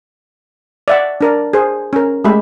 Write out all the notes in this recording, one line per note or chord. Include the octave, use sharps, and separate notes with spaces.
D5 E5 F#5
D4 A#4 D5
G#4 C5
C#4 A#4
G#3 A3 G4 E5 B5